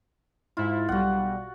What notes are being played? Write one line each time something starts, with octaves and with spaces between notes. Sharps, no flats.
G#2 E4 F4
B1 G3 F#4 F#5